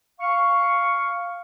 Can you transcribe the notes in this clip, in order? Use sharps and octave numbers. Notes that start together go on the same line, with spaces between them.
F5 C#6